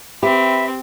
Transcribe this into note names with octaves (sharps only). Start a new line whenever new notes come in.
C4 G4 B4 E5